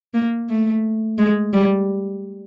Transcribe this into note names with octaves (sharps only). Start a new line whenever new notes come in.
A#3
A3
G#3
G3